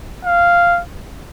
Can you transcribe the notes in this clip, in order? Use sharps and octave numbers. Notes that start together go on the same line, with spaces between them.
F5